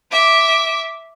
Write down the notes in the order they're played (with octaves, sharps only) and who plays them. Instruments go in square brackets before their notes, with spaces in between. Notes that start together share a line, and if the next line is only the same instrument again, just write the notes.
[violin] E5 D6